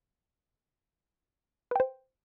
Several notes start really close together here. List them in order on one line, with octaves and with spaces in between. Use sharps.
B4 G5 C5